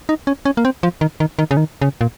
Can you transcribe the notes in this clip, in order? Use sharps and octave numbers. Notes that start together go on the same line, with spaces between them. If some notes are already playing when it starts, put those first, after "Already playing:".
D#4
C#4
C#4
A#3
C4
F3
D#3
D#3
D#3
C#3
D#3
C#3
A#2